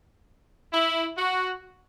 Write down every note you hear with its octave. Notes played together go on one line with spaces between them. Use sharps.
E4
F#4